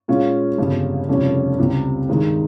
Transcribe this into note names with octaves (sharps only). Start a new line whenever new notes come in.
A#2 G#3 C#4 F4
G1 F2 C#3 G3
F1 F2 C#3 G3 C#4
C#2 C3 G3
G2 D#3 G#3